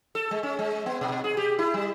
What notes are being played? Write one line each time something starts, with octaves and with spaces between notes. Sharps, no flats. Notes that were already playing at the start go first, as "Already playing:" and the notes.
A4
G#3
C#4
G#3
B3
B2
G#4
G4
E4
G3